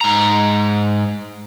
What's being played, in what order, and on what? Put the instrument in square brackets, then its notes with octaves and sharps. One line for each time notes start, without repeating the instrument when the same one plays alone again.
[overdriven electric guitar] G#2 A#5